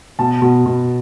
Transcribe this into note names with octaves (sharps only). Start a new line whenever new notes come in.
B2 A5
B2
B2